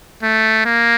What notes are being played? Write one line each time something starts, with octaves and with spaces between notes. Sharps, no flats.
A3
A#3